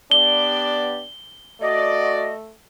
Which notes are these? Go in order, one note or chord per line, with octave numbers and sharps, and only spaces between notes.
B3 D4 G4 D5 G7
A3 F#4 D5 D#5